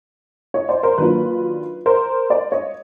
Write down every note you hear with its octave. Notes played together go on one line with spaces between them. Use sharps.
C#5 D#5
C5 D5
A#4 C5
D#3 F#3 A#3 D4 F4 B4
A#4 C5
C5 D5
C#5 D#5